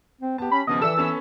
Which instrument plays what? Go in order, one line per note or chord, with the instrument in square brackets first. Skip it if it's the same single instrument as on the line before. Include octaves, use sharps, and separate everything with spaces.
[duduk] C4
[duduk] B3 [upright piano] G4 A5
[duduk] C#4 [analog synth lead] B5
[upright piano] D#1 C#3 F3 [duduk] B3 [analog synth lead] D#5
[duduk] E3 [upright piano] A4 D5 E5 [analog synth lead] E6
[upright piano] B3 C#4 A4